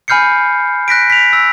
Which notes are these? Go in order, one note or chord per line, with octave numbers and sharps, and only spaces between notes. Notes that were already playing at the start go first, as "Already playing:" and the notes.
G#5 B5 F6 G6 C7 C#7
F#6 A#6 B6 D7
B6 F7
E6